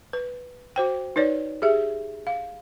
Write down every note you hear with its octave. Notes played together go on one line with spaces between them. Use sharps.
B4
F#4 C5 G5
D#4 B4 C#5 D5
G4 G#4 E5
F5